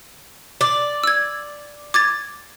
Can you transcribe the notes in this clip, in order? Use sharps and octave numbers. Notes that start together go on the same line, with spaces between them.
D5
E6 G#6
D6 G#6 A6